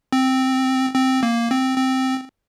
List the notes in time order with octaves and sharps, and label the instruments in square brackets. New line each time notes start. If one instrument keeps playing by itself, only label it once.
[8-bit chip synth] C4
C4
A#3
C4
C4